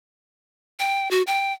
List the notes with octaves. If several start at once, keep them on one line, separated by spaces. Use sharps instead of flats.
G5
F#4
G5